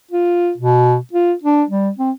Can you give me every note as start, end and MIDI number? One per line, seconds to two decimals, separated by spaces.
0.11 0.51 65
0.57 0.97 47
1.13 1.33 65
1.44 1.63 62
1.69 1.89 55
1.98 2.11 60